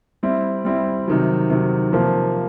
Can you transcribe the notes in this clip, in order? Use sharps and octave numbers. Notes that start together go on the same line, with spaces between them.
G3 C4 E4
G3 C4 E4
C3 D#3 F#3
C3 D#3 F#3
C3 F3 A#3